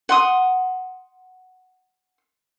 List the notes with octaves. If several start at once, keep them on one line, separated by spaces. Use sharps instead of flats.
F#5 C6 D#6